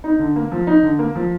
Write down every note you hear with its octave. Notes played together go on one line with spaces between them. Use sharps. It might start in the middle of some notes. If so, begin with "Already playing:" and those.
D#4
D3
A#3
F3
D#4
D3
A#3
F3